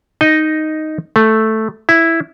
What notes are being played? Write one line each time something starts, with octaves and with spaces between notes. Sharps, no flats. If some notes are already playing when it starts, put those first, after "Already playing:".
D#4 D#5
A3
E4